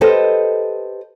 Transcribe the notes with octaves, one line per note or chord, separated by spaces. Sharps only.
G4 A4 B4 C5 D#5